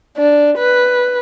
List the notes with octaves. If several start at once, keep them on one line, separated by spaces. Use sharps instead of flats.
D4
B4